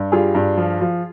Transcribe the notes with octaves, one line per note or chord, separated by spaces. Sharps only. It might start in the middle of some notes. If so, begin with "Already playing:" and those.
Already playing: G2
G3 F4 G#4
G2
F3
F3